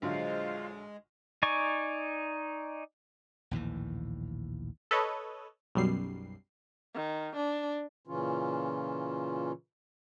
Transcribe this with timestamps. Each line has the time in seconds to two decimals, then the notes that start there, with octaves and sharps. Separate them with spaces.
0.02 A#1 D3 F#3 G#3 F4 C5
1.43 D#4 D5 G#5 C#6
3.51 A#1 D#2 A2 E3
4.91 A4 B4 C#5 D#5
5.75 B1 F#2 G3 C7
6.95 D#3
7.36 D4
8.07 A#2 C#3 E3 C#4 F4